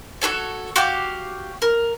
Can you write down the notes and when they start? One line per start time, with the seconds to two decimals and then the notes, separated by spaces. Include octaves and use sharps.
0.22 F#4 G#4 A4 C#5
0.76 F#4 G4 F5 D6
1.62 A#4